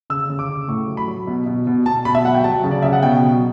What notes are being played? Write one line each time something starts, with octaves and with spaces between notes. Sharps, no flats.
C#3 E6
C#3
D6
C#3
A2 C#6
F#3
B5
F#3
B2
B2
B2
B2 A5
B2 B5
E5
F#3 F#5
G5
F#3 A5
C#3
D5
C#3 E5
F#5
B2 G5
F#3